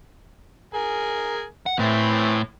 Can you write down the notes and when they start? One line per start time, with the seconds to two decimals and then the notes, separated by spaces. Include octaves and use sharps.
0.74 G#4 A#4 G#5
1.66 F#5
1.79 A2 E3 C4